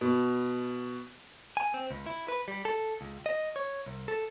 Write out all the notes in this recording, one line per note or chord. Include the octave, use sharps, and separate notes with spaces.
B2
G#5
C4
C#2
E4
B4
G3
A4
C#2
D#5
C#5
C2
A4